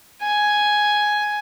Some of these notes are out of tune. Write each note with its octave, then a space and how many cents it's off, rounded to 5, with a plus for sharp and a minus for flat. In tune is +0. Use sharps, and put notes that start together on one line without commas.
G#5 +5